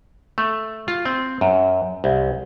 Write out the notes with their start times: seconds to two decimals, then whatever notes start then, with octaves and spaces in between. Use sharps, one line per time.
0.38 A3
0.88 F4
1.05 C4
1.41 F#2
2.04 C2